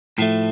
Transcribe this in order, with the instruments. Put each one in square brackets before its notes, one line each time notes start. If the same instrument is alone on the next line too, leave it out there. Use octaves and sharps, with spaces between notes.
[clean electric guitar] A2 F3 A3